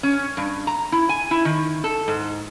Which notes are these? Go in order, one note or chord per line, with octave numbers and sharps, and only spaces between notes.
C#4
G2
A#5
E4
G#5
E4
D#3
A4
G#2